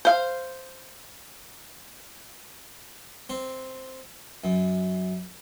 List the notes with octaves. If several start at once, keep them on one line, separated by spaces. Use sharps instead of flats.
C5 F5
C4
F#2